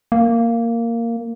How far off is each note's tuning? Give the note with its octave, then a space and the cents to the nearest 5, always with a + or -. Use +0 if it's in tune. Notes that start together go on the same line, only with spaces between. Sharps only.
A#3 -10